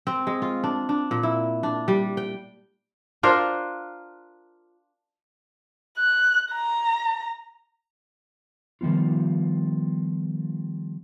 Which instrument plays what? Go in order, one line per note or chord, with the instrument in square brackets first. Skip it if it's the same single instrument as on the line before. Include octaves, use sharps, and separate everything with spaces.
[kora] C4
G#3
F4
D4
D4
A#2
E4
D4
G3
G5
D4 F4 A#4 C5
[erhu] F#6
A#5
[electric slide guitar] D#3 F3 G3 B3 F4